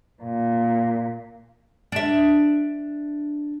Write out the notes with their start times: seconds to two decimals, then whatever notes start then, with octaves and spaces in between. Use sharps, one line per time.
0.23 A#2
1.92 D4 E5